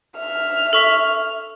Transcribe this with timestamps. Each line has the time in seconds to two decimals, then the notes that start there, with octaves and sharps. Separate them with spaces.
0.18 E5 F6
0.73 A4 C#6 B6